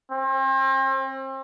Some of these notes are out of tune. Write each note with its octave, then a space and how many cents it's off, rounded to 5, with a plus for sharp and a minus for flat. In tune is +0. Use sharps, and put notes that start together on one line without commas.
C4 +40